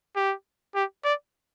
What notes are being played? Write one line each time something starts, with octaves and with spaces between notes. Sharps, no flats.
G4
G4
D5